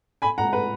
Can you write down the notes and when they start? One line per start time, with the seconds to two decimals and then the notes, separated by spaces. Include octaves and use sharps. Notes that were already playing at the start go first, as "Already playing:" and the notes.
0.22 G#5 B5
0.38 F#5 A#5
0.53 B4